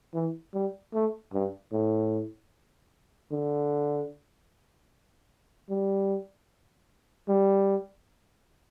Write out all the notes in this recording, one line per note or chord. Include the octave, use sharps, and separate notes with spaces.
E3
G3
A3
G2
A2
D3
G3
G3